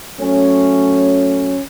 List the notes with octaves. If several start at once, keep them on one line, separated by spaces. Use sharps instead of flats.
F#3 A3 C#4